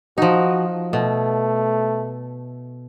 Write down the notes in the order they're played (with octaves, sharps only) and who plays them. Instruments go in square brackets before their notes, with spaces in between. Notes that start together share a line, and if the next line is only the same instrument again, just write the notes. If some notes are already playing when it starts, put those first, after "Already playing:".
[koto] F3 D#4 [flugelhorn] F#4
[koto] B2 [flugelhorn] A3